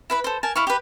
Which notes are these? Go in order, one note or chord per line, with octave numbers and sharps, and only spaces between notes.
E4 B4 B5
A4 C5
A#4 G#5 A5
E4 F5 C#6
G4 B4